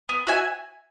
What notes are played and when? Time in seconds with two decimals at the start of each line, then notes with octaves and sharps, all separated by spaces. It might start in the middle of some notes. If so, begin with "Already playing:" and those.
0.09 B3
0.27 F#4 E5 G#5